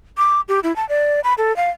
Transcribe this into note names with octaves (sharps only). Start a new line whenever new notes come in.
D6
G4
E4
A5
D5
B5
A4
F5